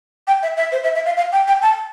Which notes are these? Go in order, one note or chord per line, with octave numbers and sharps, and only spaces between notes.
G5
E5
E5
C5
E5
E5
F5
F5
G5
G5
A5